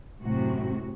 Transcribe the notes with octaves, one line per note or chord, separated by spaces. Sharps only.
F#2 A2 C3 F#4